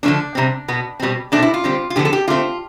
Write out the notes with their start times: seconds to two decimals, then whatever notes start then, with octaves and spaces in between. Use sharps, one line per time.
0.03 D3 F3 A3 C4 D4
0.35 C3 G3 C4
0.68 B2 B3
1.00 B2 G3 C4
1.32 B2 A3 C4 D4
1.42 E4
1.54 F4
1.64 D3 G3 C4
1.90 F4
1.96 D3 F3 B3 G4
2.05 A4
2.13 G4
2.28 D3 A3 C4 F4